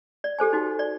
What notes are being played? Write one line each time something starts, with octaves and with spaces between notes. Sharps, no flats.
D5
G4 A4 C5 G#5
D#4 F#4
D5